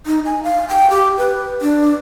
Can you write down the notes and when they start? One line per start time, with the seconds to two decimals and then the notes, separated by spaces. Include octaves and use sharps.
0.06 D#4
0.25 G#5
0.43 F5
0.69 G5
0.90 G4
1.18 B4
1.61 D4